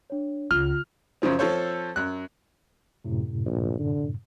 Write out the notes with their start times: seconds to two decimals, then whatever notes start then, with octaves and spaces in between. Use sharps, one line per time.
0.10 D4 C#5
0.51 C#2 F4 F6
1.22 F#2 C#3 F3 C4
1.39 F3 C4 A4 C5 C#5
1.96 F#2 F#6
3.05 F#2 A2 C3
3.46 A#1
3.79 D3